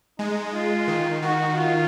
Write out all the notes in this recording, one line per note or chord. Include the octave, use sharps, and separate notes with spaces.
G#3 D#4
F4
D#3
D#3 F#4
F4